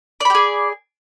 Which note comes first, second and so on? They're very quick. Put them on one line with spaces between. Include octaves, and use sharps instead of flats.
D5 B5 G4 G#4